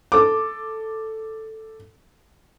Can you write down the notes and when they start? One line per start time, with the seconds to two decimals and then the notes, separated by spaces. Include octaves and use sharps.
0.12 A4 D6